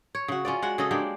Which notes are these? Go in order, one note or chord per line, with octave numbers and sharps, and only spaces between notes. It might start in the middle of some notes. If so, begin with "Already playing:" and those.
C#5
C#3 F#4
C#4 F4 D5
G#3 F#4 F#5
C#3 G#4 A4 D#5
G#3 A#3 D4 G4